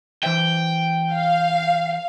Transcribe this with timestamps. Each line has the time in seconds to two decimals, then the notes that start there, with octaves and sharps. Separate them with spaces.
0.24 E3 C5 E5 G5
1.13 F5